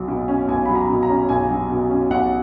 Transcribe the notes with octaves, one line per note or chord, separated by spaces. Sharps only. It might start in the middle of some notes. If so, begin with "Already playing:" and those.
Already playing: B1 F#3
B2
C#4
B1 G#5
F#3 B5
A#5
B2
A#5
C#4
B1 G#5
F#3
B2
C#4
B1 F#5